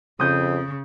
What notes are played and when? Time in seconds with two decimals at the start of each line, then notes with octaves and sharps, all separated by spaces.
0.20 F2 C#3 D#6 G6